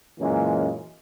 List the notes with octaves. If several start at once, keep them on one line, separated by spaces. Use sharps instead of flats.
F#2 A#2 E3 G#3 A#3 C#4